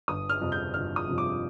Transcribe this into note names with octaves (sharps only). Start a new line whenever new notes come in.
G1 D#6
F6
F2 C3 F3
G6
G1 F6
D#6
F2 C3 F3
D6